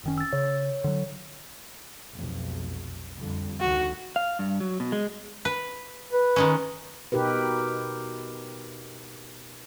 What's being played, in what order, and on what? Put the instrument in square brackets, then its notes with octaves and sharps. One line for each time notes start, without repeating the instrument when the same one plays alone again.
[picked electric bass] F#1 D#3 C#4
[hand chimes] E6 A6
[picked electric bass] C#3 [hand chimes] C#5
[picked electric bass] D3 F#3
[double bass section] F1 B1
F2 D3 G3
[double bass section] D2 D#3 [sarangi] F#4
[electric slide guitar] F5
G2
F#3
B2
G#3
[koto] B4
[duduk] B4
[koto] D#3 G#3 C#4
[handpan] B2 D#4 G4 A#4 B4